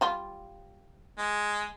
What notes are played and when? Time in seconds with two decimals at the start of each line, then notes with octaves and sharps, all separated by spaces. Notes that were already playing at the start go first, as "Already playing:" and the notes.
0.01 G3 F4
1.18 G#3